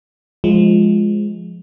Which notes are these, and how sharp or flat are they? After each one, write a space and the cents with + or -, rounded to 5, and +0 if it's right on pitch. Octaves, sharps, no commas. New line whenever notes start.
F3 +0 G#3 +0